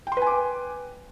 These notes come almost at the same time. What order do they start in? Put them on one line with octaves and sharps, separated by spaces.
G5 C6 B4 G#5 D6